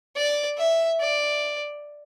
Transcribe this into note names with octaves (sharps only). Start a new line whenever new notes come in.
D5
E5
D5